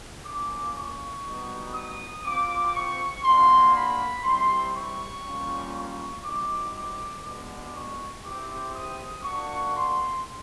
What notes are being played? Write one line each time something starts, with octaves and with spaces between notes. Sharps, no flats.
A#3 C#4 F4 D6
C#6
G3 B3 D#4 F#4
D#6
C4 F4 D6
C#6
A#3 D4 F#4 C6
B5
G3 C4 E4 G4 C6
C#6
G3 A#3 C#4 F4
C#6
G3 C4 D#4 F#4 D6
D6
G#3 B3 D4 F#4 D6
C#6
C4 E4 G4 D6
D#6
A#3 D4 F#4 C#6
C6